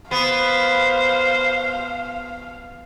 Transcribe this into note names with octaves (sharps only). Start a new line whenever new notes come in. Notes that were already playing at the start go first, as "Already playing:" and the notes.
B3 C5 F5